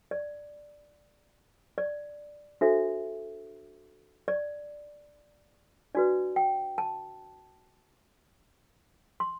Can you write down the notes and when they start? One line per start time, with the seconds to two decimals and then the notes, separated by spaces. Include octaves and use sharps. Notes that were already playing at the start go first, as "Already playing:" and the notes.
0.11 D5
1.78 D5
2.61 D4 F#4 A4 C5 E5
4.28 D5
5.95 D4 F#4 B4 D5
6.36 G5
6.78 A5
9.20 C6